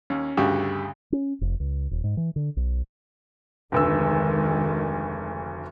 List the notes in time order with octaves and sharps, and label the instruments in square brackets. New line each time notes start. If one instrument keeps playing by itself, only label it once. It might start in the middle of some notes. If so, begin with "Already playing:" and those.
[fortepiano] D#2 [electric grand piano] C#4
[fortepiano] D2 C#3 F#4 [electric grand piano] G2 G4
[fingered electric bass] C#4
F1
C#2
D#1
G#2
E3
D3
B1
[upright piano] F1 D2 E6 [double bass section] D#3 G#3